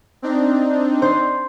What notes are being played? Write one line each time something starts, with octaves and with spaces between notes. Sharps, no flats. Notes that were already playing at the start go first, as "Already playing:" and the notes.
C4 D4 D#4
C5